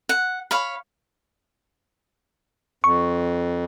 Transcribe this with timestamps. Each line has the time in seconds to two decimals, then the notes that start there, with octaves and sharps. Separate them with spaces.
0.09 F#5
0.51 C#5 F5 B5
2.84 F2 C#6